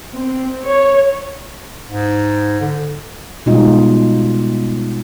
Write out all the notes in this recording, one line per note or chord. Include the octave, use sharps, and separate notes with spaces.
C4
C#5
G#2
D3
B2 G3 G#3 D#4 F4 D#5